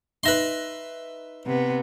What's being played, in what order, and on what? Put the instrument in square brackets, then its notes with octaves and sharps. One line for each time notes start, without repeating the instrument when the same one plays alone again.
[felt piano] D#4 A#6 [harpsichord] B4 E5 C6
[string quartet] C3 B3